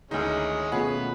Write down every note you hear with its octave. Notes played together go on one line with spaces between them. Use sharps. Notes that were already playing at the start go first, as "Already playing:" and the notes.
D2 D#3 G#3 C#4 D#4 E4
B2 A3 C#4 F4 G#4 B4 F#5